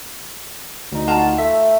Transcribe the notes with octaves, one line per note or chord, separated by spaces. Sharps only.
D2 D#4
F4 F#4 A5 A#5
A3 E5